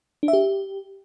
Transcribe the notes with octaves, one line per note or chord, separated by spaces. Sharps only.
D4
E5
G4